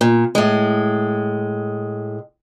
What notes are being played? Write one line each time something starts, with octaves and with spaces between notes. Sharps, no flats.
A#2
A2 G#3